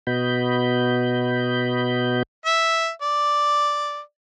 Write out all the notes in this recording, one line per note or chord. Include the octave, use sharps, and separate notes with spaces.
B2 B3 F#4 D#5 B5 G6
E5
D5